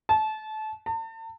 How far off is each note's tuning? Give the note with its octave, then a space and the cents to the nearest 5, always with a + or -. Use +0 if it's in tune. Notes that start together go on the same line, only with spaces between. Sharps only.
A5 -25
A5 +40